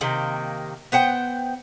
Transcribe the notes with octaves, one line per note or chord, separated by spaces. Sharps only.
C3 D#3 A#3
B3 C5 F#5 G5